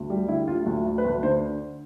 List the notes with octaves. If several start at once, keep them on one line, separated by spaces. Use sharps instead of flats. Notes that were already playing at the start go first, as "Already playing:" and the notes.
Already playing: D2
G3
D3 E4
D2 F4
D2
D2
B4
D2
D3 C5